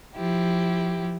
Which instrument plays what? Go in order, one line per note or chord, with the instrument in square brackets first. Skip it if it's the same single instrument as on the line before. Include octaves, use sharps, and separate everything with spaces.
[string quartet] F3 E4 G4